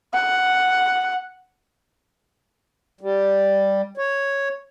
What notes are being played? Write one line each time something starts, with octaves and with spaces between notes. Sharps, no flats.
F#5
G3
C#5